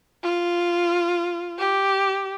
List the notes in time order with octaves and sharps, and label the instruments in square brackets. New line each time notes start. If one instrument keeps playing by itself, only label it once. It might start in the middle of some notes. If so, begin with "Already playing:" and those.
[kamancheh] F4
G4